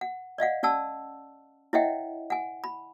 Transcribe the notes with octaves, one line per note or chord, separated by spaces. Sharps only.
F#5
D5 D#5 F5 F#5
C#4 D5 F#5 A5 E6
E4 C#5 D#5 E5 F#5 G5
F#5 G#5
B5